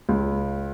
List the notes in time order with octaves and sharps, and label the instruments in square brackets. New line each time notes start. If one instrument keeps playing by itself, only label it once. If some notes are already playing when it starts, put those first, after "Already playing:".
[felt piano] C#2